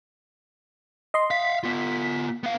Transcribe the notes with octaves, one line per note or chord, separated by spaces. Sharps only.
D#5 C6
E5 F5 B6
B3 F4
B3 F5